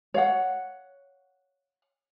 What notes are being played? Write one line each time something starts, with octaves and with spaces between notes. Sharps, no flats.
C#5 F5 F#5